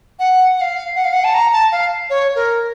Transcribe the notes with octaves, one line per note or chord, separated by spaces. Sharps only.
F#5
F#5
F5
F#5
F5
F#5
A5
A#5
A5
F5
C#5
A#4